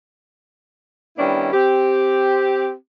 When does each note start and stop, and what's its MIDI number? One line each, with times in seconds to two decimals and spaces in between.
1.18 1.53 51
1.18 1.53 55
1.18 1.53 59
1.18 1.53 61
1.18 1.53 62
1.18 1.53 64
1.53 2.72 60
1.53 2.72 67